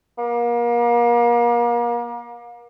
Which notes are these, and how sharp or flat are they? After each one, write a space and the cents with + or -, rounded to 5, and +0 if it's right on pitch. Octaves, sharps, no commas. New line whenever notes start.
A#3 +35